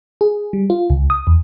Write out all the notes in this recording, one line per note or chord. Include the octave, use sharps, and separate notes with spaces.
G#4
G3
F4
C#2
D#6
E2